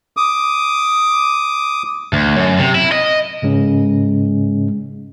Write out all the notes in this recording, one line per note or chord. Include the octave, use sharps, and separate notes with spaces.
D6 D#6
D2
F#2
C3
E4
D#5
G#2 C#3 G#3 C#4